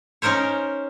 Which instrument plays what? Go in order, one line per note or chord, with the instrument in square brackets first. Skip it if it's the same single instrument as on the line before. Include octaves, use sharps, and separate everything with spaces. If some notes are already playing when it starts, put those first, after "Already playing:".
[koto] C#4 D#4 A#4 C5 C#5